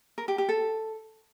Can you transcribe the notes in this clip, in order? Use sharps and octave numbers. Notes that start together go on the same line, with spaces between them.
A#4
G4
G4
A4